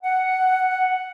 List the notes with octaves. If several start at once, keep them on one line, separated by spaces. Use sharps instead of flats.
F#5